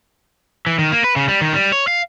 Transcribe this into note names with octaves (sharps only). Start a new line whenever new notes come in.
E3
D#3
A#3
B4
C#3
G3
D#3
G3
C#5
F5